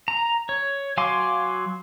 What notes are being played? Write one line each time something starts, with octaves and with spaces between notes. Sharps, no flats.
A#5
C#5
F#3 F5 G#5 C6 D6